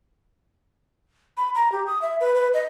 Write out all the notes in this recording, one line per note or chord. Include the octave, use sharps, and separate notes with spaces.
B5
A#5
G4
D#6
E5
B4
B4
D#5